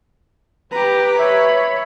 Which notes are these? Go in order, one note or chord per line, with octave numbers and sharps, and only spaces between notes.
G4 B4 A#5
C#5 E5 B5